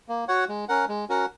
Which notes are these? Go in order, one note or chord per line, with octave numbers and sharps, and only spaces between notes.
A#3
F#4 C#5 F#5
G#3
C#4 A#4 F#5
G#3
C#4 F#4 A#4 F#5